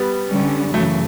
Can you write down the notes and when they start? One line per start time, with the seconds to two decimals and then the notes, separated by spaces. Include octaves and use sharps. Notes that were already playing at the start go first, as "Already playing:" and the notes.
Already playing: G3 B3
0.28 D3 G3 C#4
0.74 F#2 C#3 E3 F#3 A3